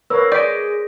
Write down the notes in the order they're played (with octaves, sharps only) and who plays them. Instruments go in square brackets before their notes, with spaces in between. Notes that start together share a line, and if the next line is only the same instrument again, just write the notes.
[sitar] A#3 [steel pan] A#4 B4 C#5 [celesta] E6
[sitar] G#3 [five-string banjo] D5 [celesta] G6 B6 D7